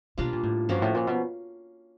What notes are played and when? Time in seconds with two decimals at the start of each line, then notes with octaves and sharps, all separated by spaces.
0.18 B2 G3 A#3 D4 F4
0.33 A#2
0.43 A2
0.69 G2 F3 A#3 C#4 F#4
0.82 A2
0.95 A#2
1.07 B2